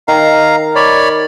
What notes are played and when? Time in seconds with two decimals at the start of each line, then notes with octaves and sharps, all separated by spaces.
0.08 D#3 F5 A#5
0.75 C#5 D5 B5